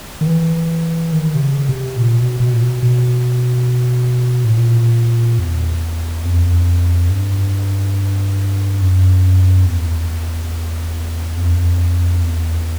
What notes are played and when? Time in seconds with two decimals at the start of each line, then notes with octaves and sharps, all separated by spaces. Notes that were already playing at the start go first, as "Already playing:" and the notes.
0.21 D#3
0.26 E3
1.12 D#3
1.35 C3
1.40 C#3
1.69 C3
1.97 A#2
2.19 B2
2.40 B2
2.53 A#2
2.62 B2
2.83 B2
4.44 A2
4.54 A#2
5.39 E2
6.24 F2
7.10 G2
8.81 F#2
9.66 E2
11.37 F2
12.22 E2